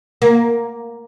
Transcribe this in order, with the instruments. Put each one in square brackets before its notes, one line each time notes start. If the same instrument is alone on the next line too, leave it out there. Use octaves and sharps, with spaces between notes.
[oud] A#3